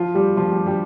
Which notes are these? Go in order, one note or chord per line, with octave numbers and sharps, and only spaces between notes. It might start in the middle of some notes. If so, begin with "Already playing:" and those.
Already playing: F3 F4
G3 G4
F3 F4
G3 G4
G3 G4